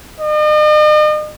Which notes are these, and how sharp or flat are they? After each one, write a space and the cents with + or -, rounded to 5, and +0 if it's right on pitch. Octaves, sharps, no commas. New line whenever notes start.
D#5 -40